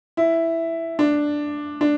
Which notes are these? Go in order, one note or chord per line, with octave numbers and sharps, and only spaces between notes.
E4
D4
D4